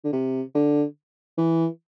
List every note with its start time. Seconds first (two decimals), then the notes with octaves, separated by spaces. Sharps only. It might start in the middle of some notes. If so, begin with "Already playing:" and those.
0.04 D3
0.13 C3
0.55 D3
1.38 E3